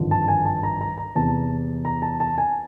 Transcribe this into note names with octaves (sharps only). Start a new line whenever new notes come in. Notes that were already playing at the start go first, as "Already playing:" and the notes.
Already playing: G#1 G2 D3 F3
A5
G#5
A5
A#5
A#5
A#5
E2 C3 E3 A5
A#5
A5
A5
G#5